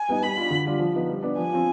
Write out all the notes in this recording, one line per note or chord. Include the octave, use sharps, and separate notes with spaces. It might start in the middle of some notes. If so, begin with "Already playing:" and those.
Already playing: G#5
G3 B3 D#4
G3 B5
D4 F4
D3
G3 D4 F4
F3
B3 D#4
G3
B3 D4
F3 G#5
C4 F4